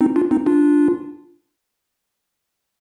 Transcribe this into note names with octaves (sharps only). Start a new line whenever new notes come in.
C4 D#4
D4 F4
C4 D#4
D4 F4